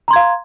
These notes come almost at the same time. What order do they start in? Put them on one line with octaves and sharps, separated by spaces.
A#5 C6 G#6 F5